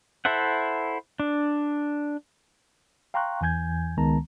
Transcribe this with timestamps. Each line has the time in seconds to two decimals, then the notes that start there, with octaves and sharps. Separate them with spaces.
0.25 E4 A4 C5 E5 F#5
1.19 D4
3.14 F5 G5 A#5 C6 C#6 F#6
3.41 E2 E3 G#5 G6 G#6
3.97 C#2 D#3 G#3 B3 A5 A#5